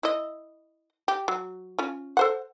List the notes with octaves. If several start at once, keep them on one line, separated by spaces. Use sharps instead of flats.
E4 D#5
G4
F#3
C#4 F4
A4 C5 F#5